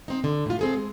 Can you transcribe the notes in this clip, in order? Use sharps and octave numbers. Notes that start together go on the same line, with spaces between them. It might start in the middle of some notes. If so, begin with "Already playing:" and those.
C4 D#4
D3
A2 F4
C4 G#4 A4
G#3